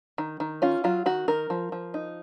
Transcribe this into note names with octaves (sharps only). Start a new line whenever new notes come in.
D#3
D#3
C#4 F4
F#3 F4
D#3 F#4
D#3 A#4
F3
F3
D#4